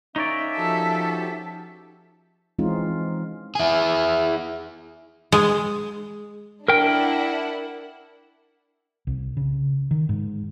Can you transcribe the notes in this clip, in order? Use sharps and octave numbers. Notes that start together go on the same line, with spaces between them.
A#3 C#4 D#4 C#5 D5 E5
F3 F#4 G4 A4
E3 G#3 C4 C#4 D#4 F4
E4 G#4
G#3
D4 E4 A#4 F#5 G5
C2
C#3
D#3
G#2